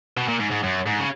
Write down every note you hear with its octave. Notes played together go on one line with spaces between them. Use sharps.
B2
A#2
G#2
G#2
F#2
G#2
C#3